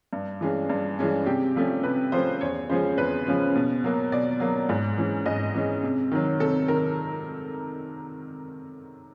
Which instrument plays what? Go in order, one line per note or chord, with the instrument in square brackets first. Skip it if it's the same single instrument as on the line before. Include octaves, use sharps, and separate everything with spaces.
[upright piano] G2
E3 G#3 C#4
G2
E3 G#3 C#4
C3 G4
F3 A3 C#4
C3 B4
F3 A3 C#4 C5
E2 C#5
C#3 F3 G#3 C#4 C5
E2 B4
C#3 F3 G#3 C#4
B2
F#3 A#3
B2 D5
F#3 A#3
G#2
E3 G#3 C#4
G#2 D#5
E3 G#3 C#4
C3
D#3 F#3
C3 A4
D#3 A#4